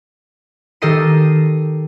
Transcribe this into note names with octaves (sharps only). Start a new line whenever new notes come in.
D#3 G4 A4 D#5 C7 D#7